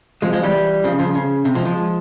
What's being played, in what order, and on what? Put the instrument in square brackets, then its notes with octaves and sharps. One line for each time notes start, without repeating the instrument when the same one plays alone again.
[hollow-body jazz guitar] F3 G#3
F3 G#3
E3 G3
C#3 F3
C#3 F3
C#3
C3
F3 G#3
F3 G#3